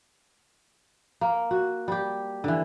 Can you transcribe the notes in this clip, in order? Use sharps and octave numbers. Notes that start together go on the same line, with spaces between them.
A#3
F#4
G3 G4
D3 E3